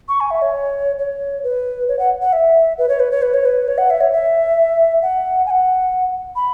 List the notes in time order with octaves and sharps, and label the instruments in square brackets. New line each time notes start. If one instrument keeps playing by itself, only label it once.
[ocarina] C#6
G#5
E5
C#5
C#5
B4
C#5
F#5
F#5
E5
B4
C#5
B4
C#5
B4
C#5
B4
C#5
F#5
E5
C#5
E5
F#5
G#5
F#5
B5